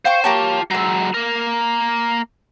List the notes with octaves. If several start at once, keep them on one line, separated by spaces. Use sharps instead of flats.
C5 F5 G5 C#6
A#3 F4 G4 C#5 A5
F#3 G#3 A#5 E6
A#3 A#4